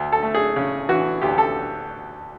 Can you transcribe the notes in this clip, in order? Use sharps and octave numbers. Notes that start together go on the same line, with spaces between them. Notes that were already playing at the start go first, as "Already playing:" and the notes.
Already playing: D2
A4
A3
G#4
C#3
E3 F#4
D2 G4
A4